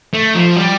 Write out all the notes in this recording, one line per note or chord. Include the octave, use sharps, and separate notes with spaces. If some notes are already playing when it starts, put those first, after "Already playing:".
A3
F3
G3